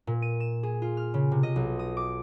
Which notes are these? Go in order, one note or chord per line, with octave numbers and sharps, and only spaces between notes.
A#2
D#7
E7
G#4
F4
F6
C#3
C3
D#5
B1
D#6
D6